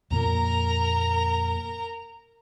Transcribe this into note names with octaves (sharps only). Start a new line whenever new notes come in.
F2 A#2 A#3 A#4 A#5